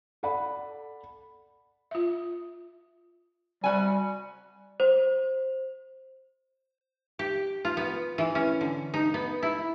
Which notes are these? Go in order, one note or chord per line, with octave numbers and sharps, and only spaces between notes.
A4 D5 F#5 B5
F4 E5
G3 F#4 G#5
C5
G4
F4
B3
E3
C#4
D3
D#4
B3
E4